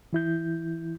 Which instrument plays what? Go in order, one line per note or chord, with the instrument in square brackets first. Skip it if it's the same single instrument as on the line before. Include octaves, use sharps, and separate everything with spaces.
[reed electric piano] E3 E4 G6